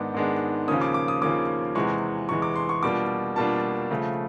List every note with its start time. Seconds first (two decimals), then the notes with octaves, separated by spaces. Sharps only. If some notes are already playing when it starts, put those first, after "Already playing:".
Already playing: G#2 D#3 G#3 B3 D4 D6
0.14 G#2 D#3 G#3 B3 D4
0.68 D#2 C#3 F3 A#3 C#4 D#6
0.81 D6
0.94 D6
1.08 D#6
1.22 D#2 C#3 F3 A#3 C#4 D6
1.75 E2 C3 E3 G#3 C#6
2.29 E2 C3 E3 G#3 C#6
2.42 D6
2.56 C6
2.69 C#6
2.83 B2 G3 A#3 D4 F4 D6
3.36 B2 G3 A#3 D4 F4 A5
3.91 C#3 F3 A3